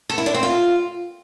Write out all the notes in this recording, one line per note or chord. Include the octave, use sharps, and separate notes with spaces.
A4
E4
D4
C4
F4